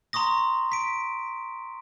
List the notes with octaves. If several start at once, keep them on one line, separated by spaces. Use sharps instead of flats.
A#5 C6 C#6 D#6 A#6
B6 D7